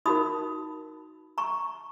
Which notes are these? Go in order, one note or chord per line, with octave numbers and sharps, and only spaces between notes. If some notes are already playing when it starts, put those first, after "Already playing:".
D#4 F#4 A#4 B5 D#6
A#5 C#6